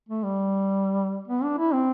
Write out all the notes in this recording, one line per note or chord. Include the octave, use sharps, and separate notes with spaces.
A3
G3
B3
D4
E4
C4